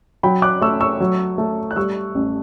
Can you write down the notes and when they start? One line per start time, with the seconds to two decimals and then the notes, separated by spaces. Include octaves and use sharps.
0.23 F#3 G5 B5
0.42 D6 F#6
0.61 A3 C#6 E6
0.81 C#6 E6
1.00 F#3
1.38 A3
1.71 F#6
1.76 G3 C#6 E6
2.15 A1